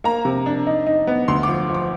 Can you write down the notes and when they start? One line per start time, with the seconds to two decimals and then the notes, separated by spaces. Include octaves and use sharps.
0.04 A#3 A#5
0.25 C3
0.46 D4
0.67 D#4
0.86 D#4
1.07 B3
1.28 D2 C6
1.43 D6
1.48 F3
1.69 F3
1.74 D6